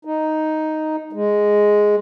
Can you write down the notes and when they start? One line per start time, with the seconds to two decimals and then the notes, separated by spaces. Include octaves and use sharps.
0.05 D#4
1.13 G#3